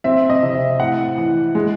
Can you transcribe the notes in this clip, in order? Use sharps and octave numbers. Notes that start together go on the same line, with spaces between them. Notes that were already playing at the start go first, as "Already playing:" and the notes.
C4 E5
D#5
C3
E5
A2 F#5
E3
G#3